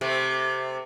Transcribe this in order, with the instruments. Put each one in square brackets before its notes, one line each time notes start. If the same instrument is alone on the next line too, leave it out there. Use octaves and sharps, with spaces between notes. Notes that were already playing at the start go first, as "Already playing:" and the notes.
[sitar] C3 A3